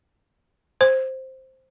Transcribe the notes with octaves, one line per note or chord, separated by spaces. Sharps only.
C5